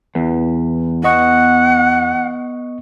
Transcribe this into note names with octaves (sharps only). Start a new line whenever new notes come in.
E2 E3
B3 D#5 F#5 C#6